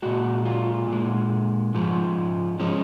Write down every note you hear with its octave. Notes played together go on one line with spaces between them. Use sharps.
A#2 G#3 F#4
F4
A#2 G#3
G#2 F3 G#3
F3 G#3 C#4